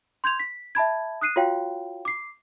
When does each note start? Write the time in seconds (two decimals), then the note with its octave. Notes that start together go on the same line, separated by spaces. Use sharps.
0.24 C6 G6 G#6 F7
0.39 B6
0.75 E5 A5 B5 G#6
1.21 D#6 F#6 C7 D#7
1.36 F4 F#4 C#5 F5 G5
2.05 D6 C7